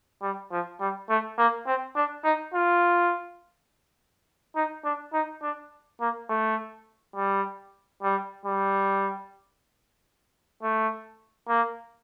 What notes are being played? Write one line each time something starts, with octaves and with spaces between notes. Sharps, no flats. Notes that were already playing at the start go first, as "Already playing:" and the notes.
G3
F3
G3
A3
A#3
C4
D4
D#4
F4
D#4
D4
D#4
D4
A#3
A3
G3
G3
G3
A3
A#3